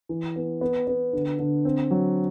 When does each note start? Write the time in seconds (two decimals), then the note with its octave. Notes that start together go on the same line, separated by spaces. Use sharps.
0.09 E3
0.36 B3
0.61 B3
0.87 B3
1.13 D3
1.39 D3
1.65 C4
1.91 F#3